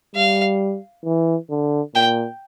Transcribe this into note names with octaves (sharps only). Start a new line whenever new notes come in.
G3 F5
E3
D3
A#2 G5